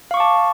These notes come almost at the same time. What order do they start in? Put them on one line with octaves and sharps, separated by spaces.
F5 C#6 D6 A5